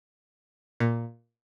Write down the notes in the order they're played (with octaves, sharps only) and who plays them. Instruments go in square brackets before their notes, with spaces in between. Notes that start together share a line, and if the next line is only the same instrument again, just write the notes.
[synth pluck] A#2